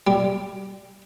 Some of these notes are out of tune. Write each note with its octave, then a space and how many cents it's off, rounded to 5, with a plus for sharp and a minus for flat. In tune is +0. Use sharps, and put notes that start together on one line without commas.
G3 +0